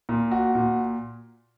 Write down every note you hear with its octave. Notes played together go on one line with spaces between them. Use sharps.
A#2
F#4
A#2